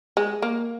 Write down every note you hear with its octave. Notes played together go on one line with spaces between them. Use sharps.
G#3
A#3